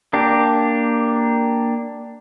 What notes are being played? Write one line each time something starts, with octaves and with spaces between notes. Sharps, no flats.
A#3 D4 G4